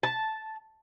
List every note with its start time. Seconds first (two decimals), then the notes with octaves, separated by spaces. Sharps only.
0.03 A5